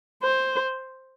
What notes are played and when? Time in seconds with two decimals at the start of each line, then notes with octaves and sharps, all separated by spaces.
0.23 C5